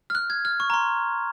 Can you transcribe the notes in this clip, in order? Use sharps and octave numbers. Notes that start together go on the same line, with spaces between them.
F6
F#6
G#6
F6
C#6
A#5
C6